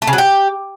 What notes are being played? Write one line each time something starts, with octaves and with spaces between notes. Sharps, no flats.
A3
C#3
F#3
G4